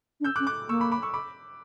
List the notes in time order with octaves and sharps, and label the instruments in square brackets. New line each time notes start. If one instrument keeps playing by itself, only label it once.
[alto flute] D4
[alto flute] C#4 [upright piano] E6 G6
[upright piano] D6 F#6
[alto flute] C#4
[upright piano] D6 F#6
[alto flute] A#3 [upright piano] C#6 E6
[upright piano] B5 D6
B5 D6
C#6 E6
B5 D6